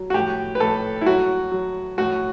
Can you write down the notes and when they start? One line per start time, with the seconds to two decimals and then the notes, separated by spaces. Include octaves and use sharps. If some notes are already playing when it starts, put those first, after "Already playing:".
Already playing: F#3
0.10 F#4
0.14 A2 G4
0.55 B4
0.60 A2 A4
1.01 E4
1.06 F#3 F#4
1.52 F#3
1.98 A2 F#4